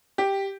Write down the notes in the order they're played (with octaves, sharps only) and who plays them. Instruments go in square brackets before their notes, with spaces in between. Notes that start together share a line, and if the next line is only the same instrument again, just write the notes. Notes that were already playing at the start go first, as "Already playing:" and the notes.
[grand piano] G4